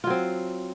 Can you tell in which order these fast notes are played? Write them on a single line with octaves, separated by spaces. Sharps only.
F4 F#3 C4